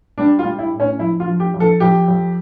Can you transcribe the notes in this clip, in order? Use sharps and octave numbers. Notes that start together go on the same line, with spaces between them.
G3 D4
F4
G3
E4
A2
C#4
F2 E4
F4
F3
G4
F2
A4
F2 G4
F2